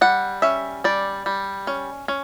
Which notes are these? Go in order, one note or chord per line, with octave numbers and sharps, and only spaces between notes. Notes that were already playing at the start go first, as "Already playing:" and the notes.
G3 F#5
C#4 E5
G3 D5
G3
C#4
C#4